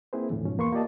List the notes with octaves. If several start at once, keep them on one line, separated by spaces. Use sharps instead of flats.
A#3 C4 E4 G#4 B4 C5
E2 A2 D3 E3
G#2 B2 F3 C#4
E2 A#3 B4 C6 C#6
A#3 F4 G4 D5 D#5 A5